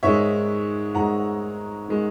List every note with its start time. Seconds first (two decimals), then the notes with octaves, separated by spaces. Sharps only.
0.03 G#2 D#3 G#3 C#5 E5
0.95 G#2 D#3 G#3 F#5 A#5
1.88 D#3 G#3